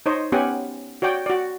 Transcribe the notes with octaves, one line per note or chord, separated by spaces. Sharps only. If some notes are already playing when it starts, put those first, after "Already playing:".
D#4 C5 C#5 D#5
B3 C#4 G4 F#5 G#5
F#4 C#5 D5 G5
F#4 D5